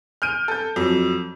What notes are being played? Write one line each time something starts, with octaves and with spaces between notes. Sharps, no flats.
F6 G6 D7 D#7
A4 G6
F2 F#3